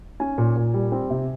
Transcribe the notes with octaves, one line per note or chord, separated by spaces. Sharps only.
C#4 G#5
A#2
A#2
G3
C4
C3